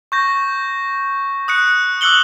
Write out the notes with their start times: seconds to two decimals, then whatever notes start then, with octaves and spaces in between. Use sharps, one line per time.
0.12 C#6 G6 A#6
1.48 D#6 F#6 C#7
2.01 D6 E6 F#6 C#7 F#7 G7